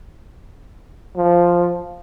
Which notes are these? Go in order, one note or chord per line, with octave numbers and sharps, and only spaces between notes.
F3